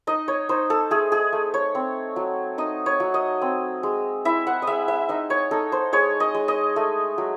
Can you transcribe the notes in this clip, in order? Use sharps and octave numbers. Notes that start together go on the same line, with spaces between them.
D#4 D#5
C#5
D#4 C5
A4
A3 G#4
G#4
A3
C#5
C4
F#3
D#4 D#5
C#5
F#3
D#5
C4
G#3
E4 E5
F#5
D#5
G#3 E5
E5
D#4 D#5
C#5
D#4 A4
C5
G#3 C#5
D#5
G#3
D#5
A3
F#3